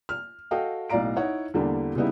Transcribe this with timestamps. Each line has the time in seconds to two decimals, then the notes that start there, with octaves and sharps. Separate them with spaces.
0.09 F6
0.51 F#4 A4 D#5 F5 G5
0.90 B1 A2 D5 F5 A#5 D7
1.16 D#4 E4 C#5 F#5
1.54 E2 D3 G3 A#3 D4
1.95 C#3 E3 G3 B3 D#4 E4